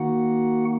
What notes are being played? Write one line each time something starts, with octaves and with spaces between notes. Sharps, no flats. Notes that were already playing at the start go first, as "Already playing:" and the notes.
Already playing: D#3 A#3 D#4 F#4 F#5